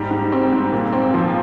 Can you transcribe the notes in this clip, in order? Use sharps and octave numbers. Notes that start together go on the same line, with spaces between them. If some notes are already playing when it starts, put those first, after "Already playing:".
Already playing: G#2 G3
G#2
C4
G#2
A#2
C4
F3